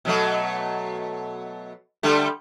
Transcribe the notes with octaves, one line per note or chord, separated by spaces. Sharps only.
B2 F#3 A3
D3 G3 A3